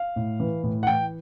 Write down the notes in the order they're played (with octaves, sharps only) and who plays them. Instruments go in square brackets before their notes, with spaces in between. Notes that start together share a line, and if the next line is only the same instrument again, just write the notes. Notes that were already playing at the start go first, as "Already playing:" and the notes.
Already playing: [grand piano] F5
A2
E3
A2
F#5
E3 G5